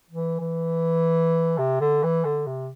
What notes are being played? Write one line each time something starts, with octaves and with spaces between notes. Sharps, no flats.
E3
E3
C3
D3
E3
D3
C3